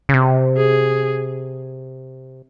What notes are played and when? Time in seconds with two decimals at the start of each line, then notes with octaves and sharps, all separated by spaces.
0.09 C#3
0.14 C3
0.57 G#4